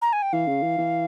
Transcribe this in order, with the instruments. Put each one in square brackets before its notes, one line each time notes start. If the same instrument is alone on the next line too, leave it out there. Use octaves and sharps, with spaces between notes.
[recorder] A#5
G#5
G5
[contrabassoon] E3 [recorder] F5
[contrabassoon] C#3
E3
E3